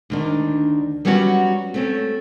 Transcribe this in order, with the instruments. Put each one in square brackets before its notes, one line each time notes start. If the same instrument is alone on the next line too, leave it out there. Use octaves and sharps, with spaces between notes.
[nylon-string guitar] D2 D#3 D4
F#3 G3 B3 C#4 D#4 F#4
A3 C4 C#4